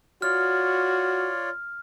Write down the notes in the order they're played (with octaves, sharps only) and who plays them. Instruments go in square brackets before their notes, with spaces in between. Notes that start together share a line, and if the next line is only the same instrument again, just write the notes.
[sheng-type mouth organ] F4 C#5 D5 [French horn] F#4 [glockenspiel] F6